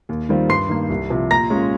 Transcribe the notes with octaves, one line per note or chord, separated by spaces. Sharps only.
D#2
D#3 G3 C4 F4
G2 C6 C7
D#3 A#3
C2
C3 F3
A#2 A#5 A#6
G#3 C#4 F4